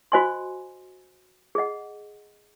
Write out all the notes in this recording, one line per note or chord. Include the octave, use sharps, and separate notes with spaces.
F#4 C5 D#5 G#5 C6
G#4 D#5 F#5